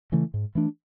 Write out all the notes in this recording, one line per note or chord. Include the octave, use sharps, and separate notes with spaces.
C#3 E3 A3
G#2
E3 A3 D4